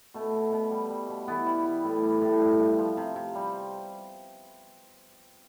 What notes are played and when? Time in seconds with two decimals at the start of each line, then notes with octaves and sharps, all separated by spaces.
0.14 B2 A3
0.33 B2
0.52 B2
0.71 G3
0.90 G3
1.09 B2
1.28 E3 B3
1.46 G3
1.66 G3
1.84 A2
2.03 G3
2.22 A2
2.40 G2
2.59 G2
2.78 F3
2.97 C3
3.16 C3
3.35 G3